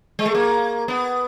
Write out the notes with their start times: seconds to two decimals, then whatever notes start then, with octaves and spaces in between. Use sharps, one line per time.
0.19 G#3
0.26 A3
0.35 A#3
0.88 B3